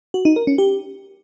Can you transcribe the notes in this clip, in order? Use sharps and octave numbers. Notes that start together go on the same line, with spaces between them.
F#4
D#4
A#4
C#4
G4